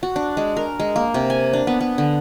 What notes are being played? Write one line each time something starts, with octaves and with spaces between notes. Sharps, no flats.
F#4
D4
G#3
A#4
G#3
A#3
C3
G#5
D4
B3
B3
D3